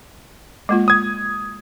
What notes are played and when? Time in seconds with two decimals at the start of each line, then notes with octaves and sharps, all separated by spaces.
0.69 G#3 A#3 F4
0.88 D#6 G#6